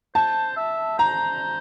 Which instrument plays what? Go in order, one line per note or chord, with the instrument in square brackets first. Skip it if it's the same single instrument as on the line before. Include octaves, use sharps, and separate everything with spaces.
[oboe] C5 [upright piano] A5
[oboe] E5
[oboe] C5 [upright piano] A#5